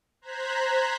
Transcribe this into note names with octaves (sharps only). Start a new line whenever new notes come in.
C5 A#5 F#6 G#6 B6